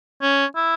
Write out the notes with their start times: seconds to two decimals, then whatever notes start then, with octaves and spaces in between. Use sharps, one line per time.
0.22 C#4
0.56 E4